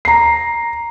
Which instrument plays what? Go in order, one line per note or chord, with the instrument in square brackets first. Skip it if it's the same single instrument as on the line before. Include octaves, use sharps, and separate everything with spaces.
[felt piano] A#5 C7